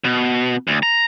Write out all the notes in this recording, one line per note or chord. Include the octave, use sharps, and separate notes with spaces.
B2
D2
A#5